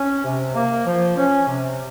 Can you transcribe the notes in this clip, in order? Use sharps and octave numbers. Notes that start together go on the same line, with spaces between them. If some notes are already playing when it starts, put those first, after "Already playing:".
Already playing: C#4
C3
A#3
F3
C#4
C3